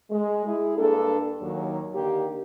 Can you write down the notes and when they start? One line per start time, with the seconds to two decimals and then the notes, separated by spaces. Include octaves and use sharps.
0.10 G#3
0.46 E4 G#4
0.78 G2 A#3 D4 A4
1.42 D#2 F#3
1.94 D3 D#3 A#3 G4